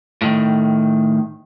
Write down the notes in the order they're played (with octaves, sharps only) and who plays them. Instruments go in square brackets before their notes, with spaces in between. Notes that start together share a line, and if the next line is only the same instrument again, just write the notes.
[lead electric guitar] A2 D#3